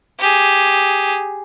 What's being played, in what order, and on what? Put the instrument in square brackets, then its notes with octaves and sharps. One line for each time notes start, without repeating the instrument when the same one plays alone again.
[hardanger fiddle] G4 G#4